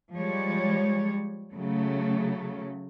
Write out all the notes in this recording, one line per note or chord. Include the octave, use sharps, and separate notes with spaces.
F3 G3 G#3 C#5
C#3 F#3 A3